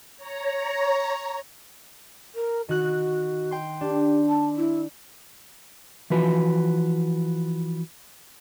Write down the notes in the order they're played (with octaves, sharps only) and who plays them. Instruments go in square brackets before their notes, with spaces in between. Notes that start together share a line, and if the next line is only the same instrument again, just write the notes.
[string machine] C#5 A#5
[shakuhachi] A#4
[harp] D#3 F#6 [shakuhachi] F#4
[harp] G5 C6
[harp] D4 [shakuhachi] G4
[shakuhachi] A5
E4
[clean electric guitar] E3 F3 F#4 B4